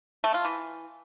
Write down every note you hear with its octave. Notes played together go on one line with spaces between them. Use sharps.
A3
F4
E3